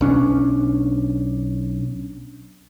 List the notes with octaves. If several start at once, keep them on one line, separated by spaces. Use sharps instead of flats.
B1 C#4 D4